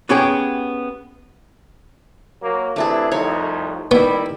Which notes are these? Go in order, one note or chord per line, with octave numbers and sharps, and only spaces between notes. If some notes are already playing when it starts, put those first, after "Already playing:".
B3 C#4 G4 G#4 G5
F#3 A#3
C3 E3 A3 D4 E4 G#4
C2 F2 D#4 C#5
D#3 G3 B3 E4